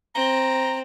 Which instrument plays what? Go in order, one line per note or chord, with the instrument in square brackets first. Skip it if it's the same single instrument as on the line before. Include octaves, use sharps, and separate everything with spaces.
[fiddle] C4 [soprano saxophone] A#5